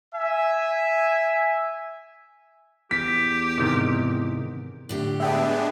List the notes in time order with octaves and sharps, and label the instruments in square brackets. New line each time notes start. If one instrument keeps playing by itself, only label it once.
[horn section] E5 G#5
[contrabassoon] E2 [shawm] G4 [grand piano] B6
[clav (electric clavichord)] G#2 C3 D#3
[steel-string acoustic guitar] A2 D3 G4
[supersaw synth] G#3 B3 D4 [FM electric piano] E5 G5